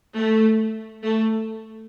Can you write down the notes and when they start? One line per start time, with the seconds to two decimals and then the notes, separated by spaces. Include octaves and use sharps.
0.18 A3
1.03 A3